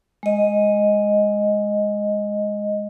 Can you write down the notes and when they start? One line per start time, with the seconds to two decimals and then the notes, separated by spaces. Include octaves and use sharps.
0.23 G#3 D#5